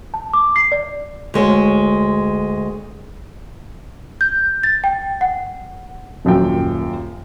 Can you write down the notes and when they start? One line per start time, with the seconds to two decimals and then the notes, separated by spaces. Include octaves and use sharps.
0.14 A5
0.34 D6
0.56 C7
0.72 D5
1.34 D2 G#3 C#5
4.21 G6
4.63 A6
4.84 G5
5.21 F#5
6.25 D#1 F#2 A#2 G5